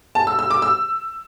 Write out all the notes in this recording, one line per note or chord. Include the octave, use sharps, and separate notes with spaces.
A5
E6
E6
D6
E6